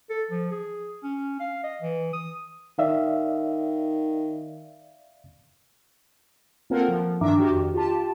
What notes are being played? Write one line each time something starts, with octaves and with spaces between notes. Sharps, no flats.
A4
F3
G#4
C#4
F5
D#5
E3
D#6
D#3 D5 E5 F5
A#3 C4 F4 A4 A#4 F#5
F3
G2 D#3 D4 E5 A#5 D6
D#3 F#4 G4
F2
F4 G4 A5